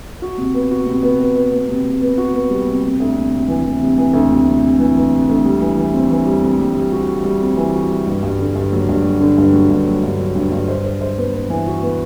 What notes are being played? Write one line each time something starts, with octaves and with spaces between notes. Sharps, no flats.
F#4
C3
B3
F#4
C3
B3
B3
B3
B3
C3
C3
B3
F#4
B3
G3
C3
C3
D2
C3
C3
E3
E3
C3
E3
D2
C3
C3
C3
E3
E3
C3
D2
G3
E3
E3
C4
E3
G3
C4
G3
G3
F#4
F#4
G3
C4
E3
F#4
G3
G2
G2
D3
G2
F#3
G2
F#3
D3
G2
F#3
G2
F#3
G2
F#3
G2
G2
C5
C5
C5
B3
B3
E3
F#4
B3